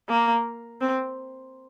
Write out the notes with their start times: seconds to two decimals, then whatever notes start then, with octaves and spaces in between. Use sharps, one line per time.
0.09 A#3
0.81 C4